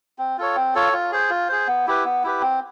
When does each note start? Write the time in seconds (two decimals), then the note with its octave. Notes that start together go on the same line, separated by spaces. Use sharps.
0.18 C4
0.38 F4 A4 C#5
0.56 C4
0.75 F4 A4 C#5
0.93 F4
1.12 G#4 C5
1.30 F4
1.49 G#4 C5
1.67 B3
1.87 E4 G4 B4
2.05 B3
2.24 E4 G4 B4
2.41 C4